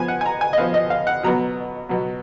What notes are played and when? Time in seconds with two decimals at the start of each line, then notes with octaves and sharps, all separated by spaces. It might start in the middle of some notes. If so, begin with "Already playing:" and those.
Already playing: F3 B3 G#5
0.08 F#5
0.21 G#5
0.26 A#5
0.41 G#5
0.53 D#5
0.58 F3 B3 F5
0.74 D#5
0.90 F5
1.07 F#5
1.23 B2 F#3 B3 A#5
1.89 B2 F#3 B3